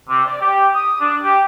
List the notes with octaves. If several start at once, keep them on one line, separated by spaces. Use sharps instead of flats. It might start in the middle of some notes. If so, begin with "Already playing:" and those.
C3
D5
G4
D#6
D4
G4